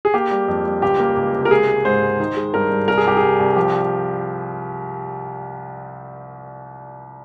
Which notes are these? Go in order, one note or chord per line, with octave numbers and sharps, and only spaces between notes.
G#4
A#3 G4
G3
F2
G3
C#2 G4
A#3
C#2
C3
A#4
G#3 G#4
G#3
G#2 C5
G#3
D#3
G#3
G2 A#4
G2
C2 A#4
G#4
C2 G4
G#4
C2
C2
F3 G4